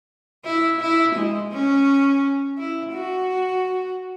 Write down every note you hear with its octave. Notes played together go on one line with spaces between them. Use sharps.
E4
E4
G#3
C#4
E4
F#4